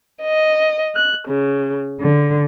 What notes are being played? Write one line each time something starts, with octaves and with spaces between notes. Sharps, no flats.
D#5
F#6
C#3
D3